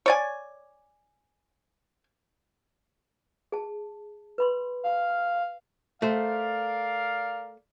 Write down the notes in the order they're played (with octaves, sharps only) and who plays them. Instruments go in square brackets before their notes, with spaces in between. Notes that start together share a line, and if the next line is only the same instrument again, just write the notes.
[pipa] C#5 D5 G#5
[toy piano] G#4 A5
B4 B5 C6
[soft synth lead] F5
[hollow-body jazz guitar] A3 C5 [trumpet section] A#4 D5 F5